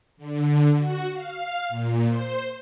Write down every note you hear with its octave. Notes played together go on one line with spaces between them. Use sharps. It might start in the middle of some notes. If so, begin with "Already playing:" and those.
D3
F#4
F5
A#2
C5